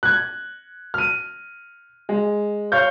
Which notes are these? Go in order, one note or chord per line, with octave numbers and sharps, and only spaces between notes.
F#6 G#6
F6 D#7
G#3
C#5 F5 C#6 F6 G6